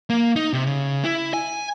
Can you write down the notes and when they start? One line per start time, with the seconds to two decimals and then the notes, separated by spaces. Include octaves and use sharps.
0.10 A#3
0.36 D#4
0.53 C3
0.67 C#3
1.04 E4
1.34 G#5